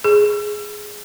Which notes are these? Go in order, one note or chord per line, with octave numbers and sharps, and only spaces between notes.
G#4